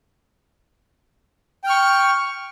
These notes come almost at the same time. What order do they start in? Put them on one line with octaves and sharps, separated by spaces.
G5 F6 C#6